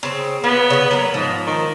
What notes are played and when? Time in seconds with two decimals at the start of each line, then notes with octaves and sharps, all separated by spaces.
0.03 C#3 C4
0.44 B3 F4
0.70 C#3 C#5
0.91 F#3 A#3
1.14 G#2 F3
1.47 D#3